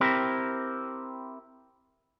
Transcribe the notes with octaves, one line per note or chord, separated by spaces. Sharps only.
C4 E4 G4 A#4